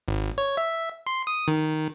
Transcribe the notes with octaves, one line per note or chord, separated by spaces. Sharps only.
G#1
C#5
E5
C6
D#6
D#3